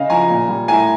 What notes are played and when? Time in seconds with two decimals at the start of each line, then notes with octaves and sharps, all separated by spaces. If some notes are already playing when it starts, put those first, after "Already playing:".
Already playing: C#3 D#5 F5
0.09 F3 G#5 A#5
0.29 A#2
0.48 G3
0.68 A2 G#5 A#5